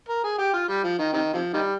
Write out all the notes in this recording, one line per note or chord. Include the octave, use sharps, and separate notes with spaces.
A#4
G#4
G4
F4
G3
F3
D#3
C3 D#3
C3 F3
D#3 G3